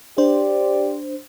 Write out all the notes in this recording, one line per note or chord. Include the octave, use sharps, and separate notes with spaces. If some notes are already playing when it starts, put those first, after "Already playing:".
D4 G4 C5 D5